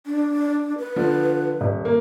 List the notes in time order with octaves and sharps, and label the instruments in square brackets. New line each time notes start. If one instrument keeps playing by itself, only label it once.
[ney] D4
B4
[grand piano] D3 F3
D#1
A#3